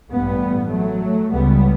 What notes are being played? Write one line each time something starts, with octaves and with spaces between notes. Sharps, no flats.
A1 G2 G3 B3
F#3 A3
C#2 C#3 G3 B3